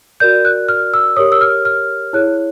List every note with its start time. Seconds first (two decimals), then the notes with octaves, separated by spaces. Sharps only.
0.20 F#4 A#4 D5 G6
0.45 F#6
0.69 F6
0.94 E6
1.16 G4 A#4 C#5 D#6
1.32 E6
1.41 F6
1.65 F6
2.13 E4 G#4 C#5 F#6